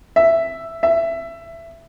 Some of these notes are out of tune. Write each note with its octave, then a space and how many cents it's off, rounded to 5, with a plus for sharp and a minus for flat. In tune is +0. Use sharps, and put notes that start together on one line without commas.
E5 +5
E5 +15